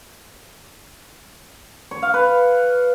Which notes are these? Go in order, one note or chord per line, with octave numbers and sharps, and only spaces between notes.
C#5
F5
B4